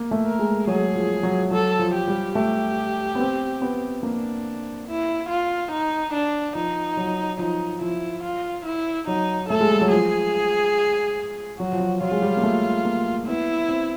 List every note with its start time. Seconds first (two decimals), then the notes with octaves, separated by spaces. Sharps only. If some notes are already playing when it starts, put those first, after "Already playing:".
Already playing: A#3
0.11 A3
0.26 A#4
0.39 G#3
0.67 F#3 G#4
0.95 F3
1.23 F#3
1.51 F#3 A4
1.79 F3
1.94 G4
2.08 G3
2.35 A3 G4
3.15 B3
3.20 C4
3.62 B3
4.03 A#3 D4
4.88 E4
5.29 F4
5.72 D#4
6.13 D4
6.55 F3 D#4
6.97 F#3
7.39 F3 D#4
7.81 F3 E4
8.23 F4
8.65 E4
9.07 F#3 D#4
9.49 A3 A4
9.61 G#3
9.71 G3
9.81 F#3
9.90 F3 G#4
11.59 F#3 F#4
11.73 F3
11.80 F#3
12.01 F#3 F4
12.11 G#3
12.22 G3
12.37 A#3
12.43 A3
12.85 A#3
13.27 B3 E4
13.69 C4